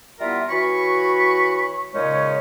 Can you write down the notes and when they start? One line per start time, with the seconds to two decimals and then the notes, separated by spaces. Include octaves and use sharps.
0.20 G3 B3 E4 F4 A#4 E5
0.49 E3 F#4 C#5 B5 C#6
1.94 A#2 C#3 G#3 C#4 D#4 C#5